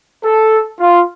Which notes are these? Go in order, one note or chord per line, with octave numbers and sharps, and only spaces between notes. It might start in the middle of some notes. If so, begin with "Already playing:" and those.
A4
F4